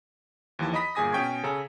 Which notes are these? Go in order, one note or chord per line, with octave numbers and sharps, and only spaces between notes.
D#2 E3 F3 A5
D#5 A#5 B5 D#6 B6
G1 A#2 G#4 G#5 D#6 A#6
B2 C#4 G5 C#6 G#6
C#3 A4 C#5 G#5 A#5